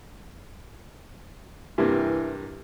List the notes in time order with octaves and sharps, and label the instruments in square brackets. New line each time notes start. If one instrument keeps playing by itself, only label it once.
[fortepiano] G2 C3 A#3 [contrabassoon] E3